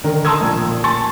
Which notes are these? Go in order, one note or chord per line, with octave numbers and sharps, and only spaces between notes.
D3 D#3 A#4
A5 A#5 C6 D#6 E6 G#6
A#1 A#2
G#5 A5 C6 C#6 A6